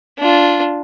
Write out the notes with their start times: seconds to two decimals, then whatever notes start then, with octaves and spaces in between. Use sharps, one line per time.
0.19 D4 F4